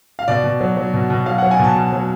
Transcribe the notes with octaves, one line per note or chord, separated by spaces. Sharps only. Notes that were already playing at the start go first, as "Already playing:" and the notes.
F5
B2 D5
B2
F#3
F#3
B2
B2
F#3 F5
F#3 F#5
G#5
B2 A5
B2
F#3